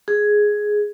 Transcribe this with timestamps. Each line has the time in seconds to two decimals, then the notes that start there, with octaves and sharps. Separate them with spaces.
0.08 G#4